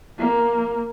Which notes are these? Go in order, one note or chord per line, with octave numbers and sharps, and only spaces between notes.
A#3